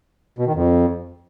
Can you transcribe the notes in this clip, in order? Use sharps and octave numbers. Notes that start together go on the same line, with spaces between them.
B2
D#3
F2